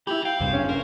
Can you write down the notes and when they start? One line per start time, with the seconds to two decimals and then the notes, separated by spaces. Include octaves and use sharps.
0.07 E4 G4 G#5 B5
0.25 F5 G5
0.40 C#2 G2 C3 G#4 C5 C#5
0.53 F#1 C#4 D4
0.69 A#4 C5